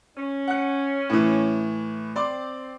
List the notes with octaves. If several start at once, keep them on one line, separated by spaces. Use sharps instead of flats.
C#4
F#5 F#6
A2 E3
C4 D5 C6 D6